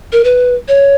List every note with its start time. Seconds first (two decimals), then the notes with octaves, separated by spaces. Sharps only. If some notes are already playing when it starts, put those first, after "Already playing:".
0.12 A#4
0.24 B4
0.68 C#5